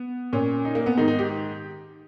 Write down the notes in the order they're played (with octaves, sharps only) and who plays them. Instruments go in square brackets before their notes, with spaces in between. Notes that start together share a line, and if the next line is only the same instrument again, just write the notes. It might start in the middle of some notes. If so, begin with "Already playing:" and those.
Already playing: [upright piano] B3
A#2 C#4
D#4
A#3
B3
G#2 D#3 D#4
D#4
G4